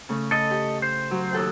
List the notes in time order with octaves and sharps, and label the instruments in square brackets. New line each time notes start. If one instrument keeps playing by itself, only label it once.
[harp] C#3 A3
[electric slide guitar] A4 D#5
[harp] G4
[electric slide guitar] C5
[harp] F#3
D#2 A4 F#5